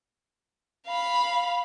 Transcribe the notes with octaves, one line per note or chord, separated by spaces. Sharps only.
F5 B5